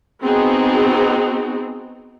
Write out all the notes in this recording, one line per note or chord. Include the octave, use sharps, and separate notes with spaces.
B3 C4 D#4 F#4 G#4